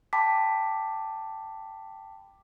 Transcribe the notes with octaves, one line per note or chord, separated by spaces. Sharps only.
G5 A5 B5 D6 B6